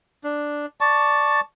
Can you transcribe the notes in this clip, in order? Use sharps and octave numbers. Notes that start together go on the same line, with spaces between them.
D4
D5 A5 C#6